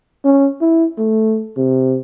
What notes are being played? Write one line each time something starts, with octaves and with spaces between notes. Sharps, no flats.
C#4
E4
A3
C3